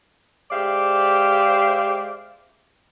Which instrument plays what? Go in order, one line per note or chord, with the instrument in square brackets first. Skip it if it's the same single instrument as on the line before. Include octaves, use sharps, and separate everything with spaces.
[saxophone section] G#3 G4 C5 D5 E5 F5